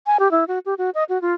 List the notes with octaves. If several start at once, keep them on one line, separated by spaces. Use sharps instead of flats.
G#5
G4
E4
F#4
G4
F#4
D#5
F#4
F4